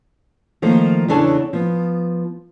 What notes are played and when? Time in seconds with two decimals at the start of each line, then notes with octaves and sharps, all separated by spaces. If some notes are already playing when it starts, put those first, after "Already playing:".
0.62 D#3 F3 A3 A#3 D#4
1.08 E2 C#3 D4 A4 C#5 A5
1.53 F3 B3